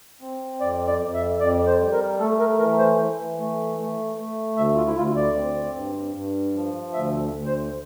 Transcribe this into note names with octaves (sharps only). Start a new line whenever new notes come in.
C4
F2 D5
D5
F2
E5
F2 D5
C5
G3
A#4
A3 A4
A#4
E3 A#4
C5
E3
A3
A3
A3
D2 E5
F4
E4
D2 F4
D5
C4
G2
G2
F3
D2 E5
D2
C5